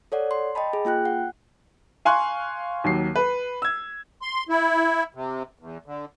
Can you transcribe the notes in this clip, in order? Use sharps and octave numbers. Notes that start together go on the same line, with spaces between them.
A4 C#5 D5 F#5
C6
D#5 G5 A5 B5
G#4
A#3 F4 G5 F#6
F#5
F5 G#5 C6 C#6 F#6
D#2 F#3 C7
B4
E6 G#6
C6
E4
C3
E2
D3